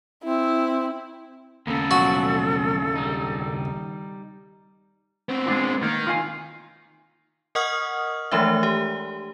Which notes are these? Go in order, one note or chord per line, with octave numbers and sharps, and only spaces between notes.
C4 E4
D#2 C#3 A#3 B3 A4
B2 F3 F#3 F#4
G3 D#4
B3 C4
G#3 D4 F4
D#3 A#3
F4 F5 G#5
A#4 D#5 F#5 C#6 D#6 F6
E3 F3 G#3 A3 D4 E5
G4